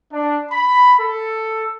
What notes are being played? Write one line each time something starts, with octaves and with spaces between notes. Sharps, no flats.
D4
B5
A4